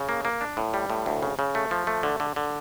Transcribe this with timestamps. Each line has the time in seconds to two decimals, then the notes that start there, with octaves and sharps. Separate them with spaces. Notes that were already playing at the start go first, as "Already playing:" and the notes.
Already playing: C#3
0.09 A#3
0.25 A#3
0.41 D4
0.57 A2
0.74 G3
0.90 A2
1.06 D2
1.23 C#3
1.39 C#3
1.55 A3
1.71 F3
1.87 A3
2.03 D3
2.20 D3
2.36 D3